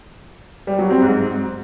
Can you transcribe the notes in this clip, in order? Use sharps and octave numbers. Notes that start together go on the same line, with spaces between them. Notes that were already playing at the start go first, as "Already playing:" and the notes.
G3
F#3
C4
G#2